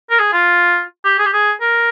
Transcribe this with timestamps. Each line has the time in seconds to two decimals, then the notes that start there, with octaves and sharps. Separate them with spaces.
0.10 A#4
0.19 G#4
0.33 F4
1.04 G4
1.19 G#4
1.26 G4
1.33 G#4
1.61 A#4